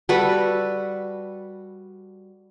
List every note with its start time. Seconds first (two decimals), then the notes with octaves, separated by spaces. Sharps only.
0.09 G3 F#4 A4 B4